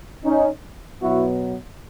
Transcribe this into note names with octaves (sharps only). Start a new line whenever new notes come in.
C#4 D#4
B2 F#3 B3 E4 F#4